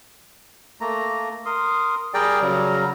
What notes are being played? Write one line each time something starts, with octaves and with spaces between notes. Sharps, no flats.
A3 A#3 A#5
A#4 C6 D#6
G3 G#4 A#4 D5 G5 A#5
C#3 F#3